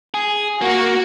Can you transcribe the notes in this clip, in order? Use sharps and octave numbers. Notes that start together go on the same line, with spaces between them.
G#4
A#3 F#4